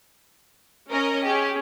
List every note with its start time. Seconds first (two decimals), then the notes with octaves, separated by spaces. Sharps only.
0.91 C#4 A#4 D#5
1.24 C#4 G4 G#4